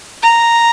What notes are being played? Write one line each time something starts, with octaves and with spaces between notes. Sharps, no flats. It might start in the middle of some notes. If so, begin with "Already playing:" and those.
A#5